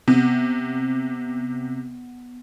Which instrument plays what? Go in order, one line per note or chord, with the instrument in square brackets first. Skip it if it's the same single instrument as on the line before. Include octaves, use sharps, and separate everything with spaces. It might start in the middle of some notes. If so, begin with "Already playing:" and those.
[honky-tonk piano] C3 [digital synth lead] B3